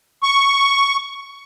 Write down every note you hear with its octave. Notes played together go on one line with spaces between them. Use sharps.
C#6